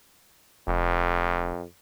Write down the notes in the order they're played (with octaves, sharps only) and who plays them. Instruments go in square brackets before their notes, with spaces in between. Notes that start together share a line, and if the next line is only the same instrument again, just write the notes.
[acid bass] F1 [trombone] F2